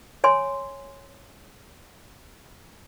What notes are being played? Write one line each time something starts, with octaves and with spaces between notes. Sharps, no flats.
C#5 G#5 C6